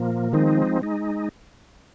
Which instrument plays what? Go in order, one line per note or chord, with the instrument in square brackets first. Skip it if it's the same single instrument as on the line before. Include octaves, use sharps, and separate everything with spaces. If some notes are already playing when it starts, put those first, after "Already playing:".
Already playing: [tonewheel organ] A#2 F3 A#3
[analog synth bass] D#3 [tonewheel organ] F3 G#3 C4 D#4
[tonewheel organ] G#3 D#4